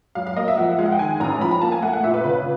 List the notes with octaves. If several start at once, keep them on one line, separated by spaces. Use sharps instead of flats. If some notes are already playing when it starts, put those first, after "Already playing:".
F#3 F5
F5
A#3 D#5
E5
F3 F#5
E5
G#3 F5
F#5
G5
D#3 G#5
A1 A#5
F3 B5
A#5
A#3 A5
G#5
A3 F#5
F#5
A#2 E5
B4
C#3 B4